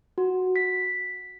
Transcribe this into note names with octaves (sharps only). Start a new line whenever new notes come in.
F#4
B6